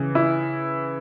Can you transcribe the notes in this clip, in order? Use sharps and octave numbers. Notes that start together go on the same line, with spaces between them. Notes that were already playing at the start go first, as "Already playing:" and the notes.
Already playing: C#3 E3
E4